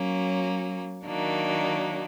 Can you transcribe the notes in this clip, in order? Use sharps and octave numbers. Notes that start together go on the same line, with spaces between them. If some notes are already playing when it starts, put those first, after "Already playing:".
Already playing: F#3 A#3 C#4
D#3 F#3 A#3 D4